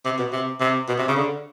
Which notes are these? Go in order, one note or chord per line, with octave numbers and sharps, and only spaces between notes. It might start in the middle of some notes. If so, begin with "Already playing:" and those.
C3
B2
C3
C3
B2
C3
C#3
D3